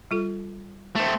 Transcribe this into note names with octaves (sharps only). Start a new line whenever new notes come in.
G3 F4 A4
A3 C4